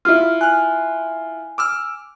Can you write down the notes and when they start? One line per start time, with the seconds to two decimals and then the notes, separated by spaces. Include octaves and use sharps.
0.05 E4 F4 F6
0.41 G#5 F6 F#6
1.58 D6 E6 F6